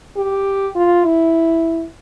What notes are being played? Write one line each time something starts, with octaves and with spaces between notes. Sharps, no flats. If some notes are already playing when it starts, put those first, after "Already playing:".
G4
F4
E4